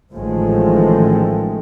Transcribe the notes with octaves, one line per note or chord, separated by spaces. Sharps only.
A1 A2 D#3 F3 G#3 A3